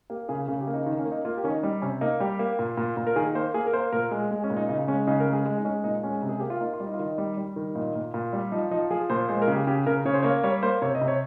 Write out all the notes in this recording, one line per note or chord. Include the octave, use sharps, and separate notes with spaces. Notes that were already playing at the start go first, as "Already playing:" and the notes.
A#3 G4
C#3 G#4
C#3 G#4
G4
A#3
D#4
D#3 D#4
C#4
A#3
D#4
A#3 F4
G4
D#3 C#4
D#4
G3 D#4
C3 C#4
A#3 D#4
G3 G4
A#3
A#2
A#2
A#2
A#4
D#3 G#4
A#3 C5
A#3 G#4
A#4
A#3 C5
A#2 A#4
G#3
G#3
C#4
A#2
D#4
C#3 D#4
G#3 C#4
C#3 D#4
A#4
G#3
G#4
G#3
D#4
G#3 C#4
A#2 D#4
G#3 C#4
C3
G#4
A#3 G4
F4
A#3 D#4
F4
G3
D#4
F4
D#3 D#4
G3
G3
D#3
A#2 D#4
A#2
A#2
G3
F3 D#4
F3 D#4
F3 G#4
A#2 C5
G#3 C5
A#4
C#3
G4
C#3 G4
C#3 A#4
C#3 C#5
C5
A#3 C#5
G3 C#5
A#3 C5
C3 C#5
D#5
C3
C#5